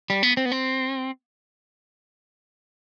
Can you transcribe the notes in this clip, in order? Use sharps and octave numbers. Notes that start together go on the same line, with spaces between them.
G3
B3
C4
B3
C4